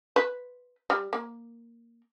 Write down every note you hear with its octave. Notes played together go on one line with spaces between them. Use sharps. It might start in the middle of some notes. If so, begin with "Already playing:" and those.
B4
G3
A#3